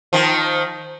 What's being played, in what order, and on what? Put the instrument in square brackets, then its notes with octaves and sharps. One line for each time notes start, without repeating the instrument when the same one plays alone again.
[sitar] D#3 F3